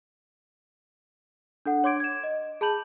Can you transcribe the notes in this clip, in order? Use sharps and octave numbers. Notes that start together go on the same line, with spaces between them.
D4 A4 F#5
D4 C#5 C6 D6 G#6 D7
G#6 E7
D#5
G#4 A5 B5 G6 F#7